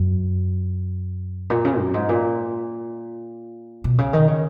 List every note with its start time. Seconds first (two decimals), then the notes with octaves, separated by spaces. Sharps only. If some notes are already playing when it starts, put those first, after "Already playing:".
Already playing: F#2
1.50 A#2
1.65 C#3
1.79 F#2
1.94 G#2
2.09 A#2
3.84 B2
3.98 C#3
4.13 D#3
4.28 C#3